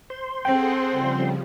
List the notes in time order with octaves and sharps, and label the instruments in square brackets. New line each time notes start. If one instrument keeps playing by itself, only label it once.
[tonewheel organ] C5 C6
[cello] C4 [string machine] G#4 A4 F#5 [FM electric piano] G5
[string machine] C#3 F3 G3